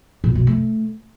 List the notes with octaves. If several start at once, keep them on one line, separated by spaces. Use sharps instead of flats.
A#2
B2
A3